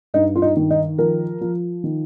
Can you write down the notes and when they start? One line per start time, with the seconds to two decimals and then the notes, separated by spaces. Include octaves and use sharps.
0.14 G2 D#4
0.36 F4
0.42 D#4
0.57 D#3
0.71 D#4
0.98 F3 A#4
1.41 F3
1.84 D#3